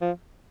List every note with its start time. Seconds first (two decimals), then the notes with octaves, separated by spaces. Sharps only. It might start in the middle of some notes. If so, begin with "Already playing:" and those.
0.01 F3